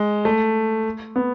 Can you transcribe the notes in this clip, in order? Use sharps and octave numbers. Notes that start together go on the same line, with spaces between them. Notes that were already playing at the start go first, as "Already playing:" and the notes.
Already playing: G#3
A3
B3